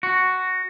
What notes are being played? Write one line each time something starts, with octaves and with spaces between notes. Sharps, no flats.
F#4